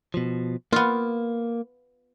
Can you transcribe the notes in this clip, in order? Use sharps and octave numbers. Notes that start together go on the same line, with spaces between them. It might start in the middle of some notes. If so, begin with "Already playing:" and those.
B2 F3
A#3 B3 F4